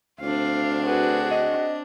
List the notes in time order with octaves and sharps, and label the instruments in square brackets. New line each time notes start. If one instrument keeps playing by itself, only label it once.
[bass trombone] D2 [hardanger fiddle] C4 D4 [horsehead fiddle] F5
[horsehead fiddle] F#4 G#4 [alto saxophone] B4
[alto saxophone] D#5